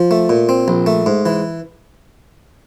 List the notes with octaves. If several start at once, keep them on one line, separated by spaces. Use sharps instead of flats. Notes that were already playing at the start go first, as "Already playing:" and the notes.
Already playing: F3
A3
A#2
C4
A#1
A3
G#2
E3